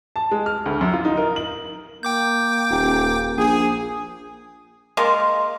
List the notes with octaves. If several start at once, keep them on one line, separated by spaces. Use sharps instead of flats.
A5
G#3
F6
D2
F#2
F4
D#4
A#4
F#7
A#3 G5 D6 G6
D#1
A#1 G#4
G#3 A#3 F4